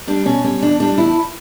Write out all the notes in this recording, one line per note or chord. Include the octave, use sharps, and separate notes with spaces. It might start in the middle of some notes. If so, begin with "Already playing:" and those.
G3 D4
B2 C#4
G3 C#4
E2 D4
G3 D4
E2 E4